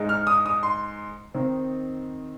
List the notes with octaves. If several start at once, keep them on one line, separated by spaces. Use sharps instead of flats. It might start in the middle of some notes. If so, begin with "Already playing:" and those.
Already playing: G#2 G#3 D#4
F6
D#6
D#6
C6
D#3 C4 D#4